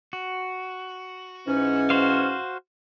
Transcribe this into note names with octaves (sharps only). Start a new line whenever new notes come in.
F#4
G#2 E3 C#4
F#4 C5 F5